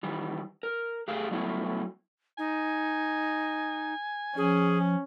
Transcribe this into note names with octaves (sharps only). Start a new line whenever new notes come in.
D#3 E3 G3
A#4
A3 G4 G#4 F5
F#3 G3 A3 B3 E4
D#4 G#5
F3 C#4 G#4